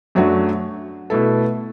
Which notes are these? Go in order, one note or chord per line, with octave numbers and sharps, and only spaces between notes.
F#2 F#3 A3 D4 F#4
B2 A3 E4 A4